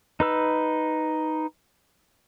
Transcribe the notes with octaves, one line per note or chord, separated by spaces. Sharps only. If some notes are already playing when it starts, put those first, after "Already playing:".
D#4 B4 E6